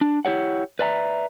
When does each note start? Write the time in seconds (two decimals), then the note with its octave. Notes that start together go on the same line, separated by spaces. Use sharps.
0.01 D4
0.25 E4 G4 C#5 F#5
0.79 B4 D5 E5 A5 A#5